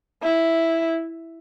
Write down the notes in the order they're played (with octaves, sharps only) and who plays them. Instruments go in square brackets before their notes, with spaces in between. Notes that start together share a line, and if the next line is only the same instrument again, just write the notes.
[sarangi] E4